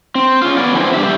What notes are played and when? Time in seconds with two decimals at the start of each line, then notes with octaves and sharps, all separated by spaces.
0.15 C4
0.42 C#4 F4
0.57 B3 C#4 D5
0.75 D3 E3 F3 C4 C#4 E4
0.94 E2 G2 D4 G4 E5